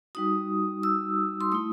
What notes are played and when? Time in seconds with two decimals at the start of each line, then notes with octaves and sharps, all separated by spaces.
0.15 G3 D#4 F#4 D#6
0.83 E6
1.41 C6
1.52 A3 E4 D#6